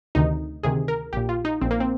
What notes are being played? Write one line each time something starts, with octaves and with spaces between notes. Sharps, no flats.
D2 C3 D#3 D#4
D2 C3 D#3 G#4
A#4
A#1 A#2 G4
F4
D#4
A#1 A#2 C4
A#3
C4